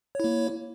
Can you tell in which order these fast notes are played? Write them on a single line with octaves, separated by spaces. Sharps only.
C#5 E4 A#3